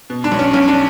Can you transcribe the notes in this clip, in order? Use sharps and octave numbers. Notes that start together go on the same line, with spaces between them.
B2
D4
B1
C#4
B1 C#4
D4